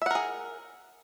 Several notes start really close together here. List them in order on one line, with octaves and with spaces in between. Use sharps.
E5 F#5 A#4 G#4